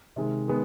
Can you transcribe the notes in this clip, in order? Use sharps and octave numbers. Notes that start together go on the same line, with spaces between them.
C3 D#3 G#3
D#3 G#3 B3